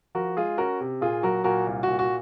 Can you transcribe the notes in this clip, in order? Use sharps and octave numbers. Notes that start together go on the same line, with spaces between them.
F3 F#4 A#4
G#3 F4 G#4
C#4 F#4 A#4
C3
A#2 F4 G#4
F#3 F#4 A#4
A#2 F#4 A#4
C2
A#2 F#4
F#4